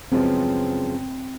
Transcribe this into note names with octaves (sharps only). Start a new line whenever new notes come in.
F#2 C#3 F3 G#3 B3 C4